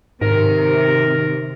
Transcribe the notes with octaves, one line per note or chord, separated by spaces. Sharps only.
G#2 C3 D#3 A#4